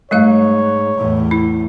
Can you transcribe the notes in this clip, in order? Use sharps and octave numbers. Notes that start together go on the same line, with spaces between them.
G#2 G3 A3 C#5 F5
E2 A2
E4